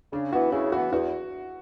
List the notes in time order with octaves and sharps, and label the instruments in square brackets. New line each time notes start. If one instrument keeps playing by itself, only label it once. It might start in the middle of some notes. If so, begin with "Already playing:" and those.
[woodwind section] C#3 [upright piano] D4
[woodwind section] E3 B3 [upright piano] F#4
[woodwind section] C#3 [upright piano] E4
[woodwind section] E3 B3 [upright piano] F#4
[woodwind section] E2 [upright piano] F#4